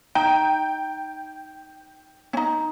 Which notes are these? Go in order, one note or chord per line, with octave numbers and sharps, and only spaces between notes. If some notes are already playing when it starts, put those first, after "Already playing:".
D#4 G5
C#4 D#4